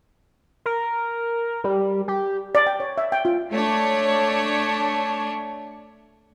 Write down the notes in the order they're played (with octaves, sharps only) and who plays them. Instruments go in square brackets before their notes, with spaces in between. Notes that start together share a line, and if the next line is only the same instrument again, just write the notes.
[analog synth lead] A#4
G3
G4
[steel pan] D5
G5
C#5
E5
G5
F4
[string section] A3 D4 C#5